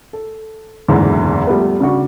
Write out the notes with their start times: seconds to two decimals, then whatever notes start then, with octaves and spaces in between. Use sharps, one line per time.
0.13 A4
0.88 F#1 E2 G#2 D3 E3
1.47 F3 G3 A3 B3
1.80 C#3 D4 F#4 C#6